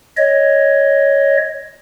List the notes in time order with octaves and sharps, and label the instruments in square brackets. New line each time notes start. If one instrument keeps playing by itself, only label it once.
[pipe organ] C#5 D#5